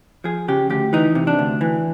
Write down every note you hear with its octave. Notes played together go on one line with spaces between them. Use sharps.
F3 G#4
C#3 G4
D2 G4
E3 D#4
C3
D4
D2
E3